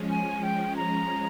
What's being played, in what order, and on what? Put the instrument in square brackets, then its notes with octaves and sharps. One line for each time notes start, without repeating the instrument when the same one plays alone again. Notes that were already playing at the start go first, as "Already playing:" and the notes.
Already playing: [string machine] F3 G#3 C#4
[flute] G#5
G5
A#5